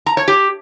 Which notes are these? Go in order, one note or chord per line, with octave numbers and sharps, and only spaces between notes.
A#5
C#5
G4